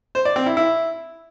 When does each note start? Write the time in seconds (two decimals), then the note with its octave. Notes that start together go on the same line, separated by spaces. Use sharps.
0.15 C5
0.25 D5
0.36 C4
0.46 E4
0.57 E4